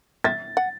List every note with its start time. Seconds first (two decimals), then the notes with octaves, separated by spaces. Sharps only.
0.24 E5 A6
0.57 F#5